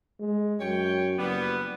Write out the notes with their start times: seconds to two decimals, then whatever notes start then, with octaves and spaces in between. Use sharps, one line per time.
0.20 G#3
0.60 F#2 C#5 G5
1.18 F#1 G3 B3